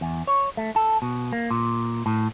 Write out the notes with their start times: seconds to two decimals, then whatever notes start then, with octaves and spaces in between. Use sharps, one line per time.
0.01 E2
0.27 C#5
0.57 A3
0.76 A4
1.02 B2
1.32 A#3
1.51 A#2
2.06 A2